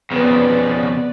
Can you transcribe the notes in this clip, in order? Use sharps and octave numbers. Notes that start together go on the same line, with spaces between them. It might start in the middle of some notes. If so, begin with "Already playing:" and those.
F2 C#3 B3 B4 D5